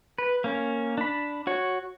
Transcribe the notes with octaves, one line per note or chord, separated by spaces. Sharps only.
B4
A#3 C#4
D4 B5
F#4 C#5